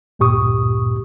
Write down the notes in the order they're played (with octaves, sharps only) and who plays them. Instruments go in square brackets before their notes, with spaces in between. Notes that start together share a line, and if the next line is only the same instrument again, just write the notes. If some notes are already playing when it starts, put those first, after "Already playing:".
[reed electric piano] D2 G2 A#2 G4 C#6 D#6